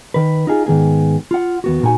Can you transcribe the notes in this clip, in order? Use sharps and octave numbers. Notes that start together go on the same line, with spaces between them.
D#3 B4
D#4 F4 G#4
G#2 D#3 B3 G#4
F4 F#5
D#2 B3 F#4
A#2 D#4 F#4 G#5